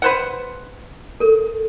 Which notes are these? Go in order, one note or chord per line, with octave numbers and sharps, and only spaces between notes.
B4 C5 F#5
A4 A#4